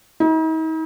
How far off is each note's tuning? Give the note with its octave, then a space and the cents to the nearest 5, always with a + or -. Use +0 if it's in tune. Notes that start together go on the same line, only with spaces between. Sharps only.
D#4 +45